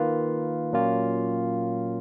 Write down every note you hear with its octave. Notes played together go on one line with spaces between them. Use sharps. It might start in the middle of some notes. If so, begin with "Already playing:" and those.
Already playing: D#3 A#3 F4 B4
A#2 F#3 A#3 C#4 F4